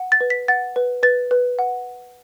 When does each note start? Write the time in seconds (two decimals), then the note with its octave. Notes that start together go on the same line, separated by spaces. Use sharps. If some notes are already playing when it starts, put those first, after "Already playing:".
Already playing: F#5
0.12 A6
0.21 B4
0.30 B6
0.48 F#5 A6
0.76 B4
1.03 B4 A6
1.31 B4
1.59 F#5